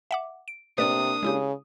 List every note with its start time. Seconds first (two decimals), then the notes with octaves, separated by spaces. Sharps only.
0.11 E5 F#5 D6
0.48 D7
0.78 C3 A#3 D4 B4 D5 D#6
1.23 C#3 G#3 E4 G4